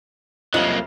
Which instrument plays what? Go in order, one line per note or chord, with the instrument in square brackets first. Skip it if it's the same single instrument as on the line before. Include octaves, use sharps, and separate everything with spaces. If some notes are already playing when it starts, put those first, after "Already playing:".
[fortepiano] C2 F2 F3 [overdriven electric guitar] F#3 A#3 [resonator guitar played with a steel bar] D#5